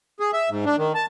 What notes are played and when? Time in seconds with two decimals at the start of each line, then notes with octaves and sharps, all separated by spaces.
0.20 G#4
0.33 E5
0.50 G#2
0.66 D4
0.78 D#3
0.95 A5